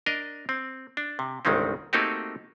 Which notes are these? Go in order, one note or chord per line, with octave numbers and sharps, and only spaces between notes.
D4 A#4 D#5
C4
D4
C3
G1 C2 D#3 G#3 C4 C#4
A3 A#3 C4 D#4 F#4 G4